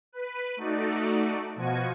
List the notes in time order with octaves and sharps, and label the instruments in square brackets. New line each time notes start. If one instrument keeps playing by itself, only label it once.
[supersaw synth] B4
A3 D#4 F#4 D5
B2 F3 F#4 G#6 D#7